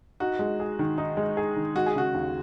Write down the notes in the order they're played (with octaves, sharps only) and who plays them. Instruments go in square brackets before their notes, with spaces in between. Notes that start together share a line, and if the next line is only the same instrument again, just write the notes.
[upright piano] D#4 [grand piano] F#4
[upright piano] G#3
G#4
D#3
D#4
G#3
G#4
D#3
[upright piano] G#3 [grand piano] F#4
[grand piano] G#4
[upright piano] C#3 [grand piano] F#4
[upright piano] D#2